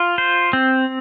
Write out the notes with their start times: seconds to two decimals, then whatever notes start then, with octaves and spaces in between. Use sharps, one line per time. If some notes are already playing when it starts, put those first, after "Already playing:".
Already playing: F4
0.18 C5
0.53 C4